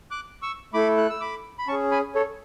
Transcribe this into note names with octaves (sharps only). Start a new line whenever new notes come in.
D6 F#6
C#6 E6
A3 E4 A4 B5 D6
F#6
E6
B5 D6
B5
C#4 A5 C#6
G#4
G#5 B5
A4 C#5